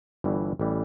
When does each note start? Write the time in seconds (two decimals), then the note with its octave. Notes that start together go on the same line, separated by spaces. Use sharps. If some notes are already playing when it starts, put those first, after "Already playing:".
0.24 G1 G2 E3
0.59 A1 E3 G3